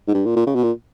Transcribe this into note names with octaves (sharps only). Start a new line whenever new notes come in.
G#2
G2
A#2
A#2
C#3
B2
A#2